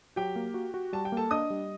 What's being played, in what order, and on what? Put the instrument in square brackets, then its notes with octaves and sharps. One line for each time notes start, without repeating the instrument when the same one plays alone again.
[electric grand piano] F#3 [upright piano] G4 G5
[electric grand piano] A#3
F#4
F#4
[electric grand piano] G3 [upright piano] A5
[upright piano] G5
[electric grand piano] A#3 [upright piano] A4 A5
[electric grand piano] D4 [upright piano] D#5 D#6
[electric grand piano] G3